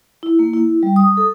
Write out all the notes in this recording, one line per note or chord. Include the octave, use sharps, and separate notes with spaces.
E4
A#3
E4
G3
D#6
A4